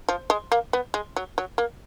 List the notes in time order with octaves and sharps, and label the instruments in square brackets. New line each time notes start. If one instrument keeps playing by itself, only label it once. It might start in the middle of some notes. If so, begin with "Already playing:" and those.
[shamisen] F3
G#3
A#3
B3
G#3
F#3
F#3
A#3